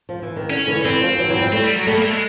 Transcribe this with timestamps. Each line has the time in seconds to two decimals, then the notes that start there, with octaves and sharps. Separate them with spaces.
0.09 F3
0.22 E3
0.36 D#3
0.50 D3 C#4
0.67 D3 E3
0.77 D#3
0.84 D3 E3 C4
1.01 D#3 F3
1.18 E3 F#3
1.29 E3 F#3
1.41 F3 G3
1.53 G3 A3 C4
1.64 G3
1.76 F#3
1.86 G3 A3 B3
1.95 A#3
2.04 A3
2.13 G#3